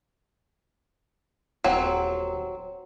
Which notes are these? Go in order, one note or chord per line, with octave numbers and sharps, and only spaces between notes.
D#1 F#3 C4